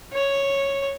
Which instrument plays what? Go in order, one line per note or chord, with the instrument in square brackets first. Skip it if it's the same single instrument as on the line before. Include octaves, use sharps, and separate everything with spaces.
[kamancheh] C#5